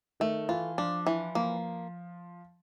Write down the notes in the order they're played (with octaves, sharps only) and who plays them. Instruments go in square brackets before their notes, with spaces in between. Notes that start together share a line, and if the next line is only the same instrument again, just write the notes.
[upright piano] D#3 [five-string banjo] A3
[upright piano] E3 [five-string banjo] F4
[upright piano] F3 [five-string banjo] D4
[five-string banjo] E3
[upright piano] F3 [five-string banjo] A#3